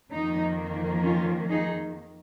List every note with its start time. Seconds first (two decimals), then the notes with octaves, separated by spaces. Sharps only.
0.10 F2 D#3 A#3 D#4
1.03 C#4 F4
1.49 D#4 G#4